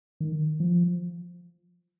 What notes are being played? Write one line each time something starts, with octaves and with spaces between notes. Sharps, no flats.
D#3
F3